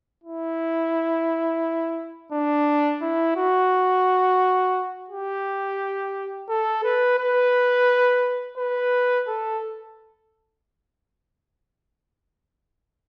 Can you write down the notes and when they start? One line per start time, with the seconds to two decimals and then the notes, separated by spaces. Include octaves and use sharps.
0.24 E4
2.32 D4
3.02 E4
3.36 F#4
5.10 G4
6.49 A4
6.84 B4
7.19 B4
8.58 B4
9.27 A4